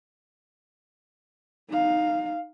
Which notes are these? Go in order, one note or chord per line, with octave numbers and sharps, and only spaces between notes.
D#4 F5